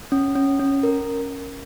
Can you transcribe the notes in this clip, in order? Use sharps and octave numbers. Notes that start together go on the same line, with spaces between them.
C#4
C#4
C#4
A#4